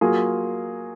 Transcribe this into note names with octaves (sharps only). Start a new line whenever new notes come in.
F#3 A#3 F4 G#4